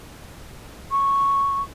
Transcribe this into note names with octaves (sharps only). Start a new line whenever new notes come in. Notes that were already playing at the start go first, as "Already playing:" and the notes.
C#6